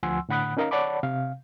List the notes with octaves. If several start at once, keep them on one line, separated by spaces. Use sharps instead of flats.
D2 F3 F#5 G#5 C6 E6
A2 D3 F#5 B5 D#6 F#6
C#4 D#4 A#4 D#5 F5 A#5
C#5 D5 F#5 A5 B5 D6
C3 F5